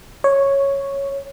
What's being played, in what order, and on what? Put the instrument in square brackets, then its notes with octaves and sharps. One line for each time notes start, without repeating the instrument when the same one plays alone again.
[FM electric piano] C#5